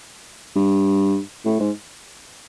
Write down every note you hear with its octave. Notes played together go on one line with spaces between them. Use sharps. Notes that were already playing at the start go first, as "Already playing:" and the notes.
G2
A2
G#2